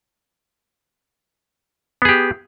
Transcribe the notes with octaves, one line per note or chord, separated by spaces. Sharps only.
B3 G4 G#4